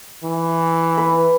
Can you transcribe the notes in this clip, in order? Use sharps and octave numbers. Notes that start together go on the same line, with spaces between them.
E3
B4